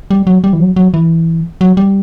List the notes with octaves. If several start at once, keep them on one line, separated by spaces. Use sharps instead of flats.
G3
F#3
G3
E3
F#3
F#3
E3
F#3
G3